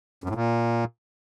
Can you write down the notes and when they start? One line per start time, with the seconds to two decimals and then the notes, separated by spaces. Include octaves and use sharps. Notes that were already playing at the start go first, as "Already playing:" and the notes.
0.24 F#2
0.29 A2
0.35 A#2